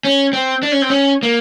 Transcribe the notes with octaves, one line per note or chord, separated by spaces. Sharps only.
C#4
C4
D4
C#4
C4
C#4
A#3